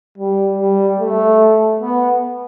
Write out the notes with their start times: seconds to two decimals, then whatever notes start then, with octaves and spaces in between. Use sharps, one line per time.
0.18 G3
0.58 G3
1.00 A3
1.81 B3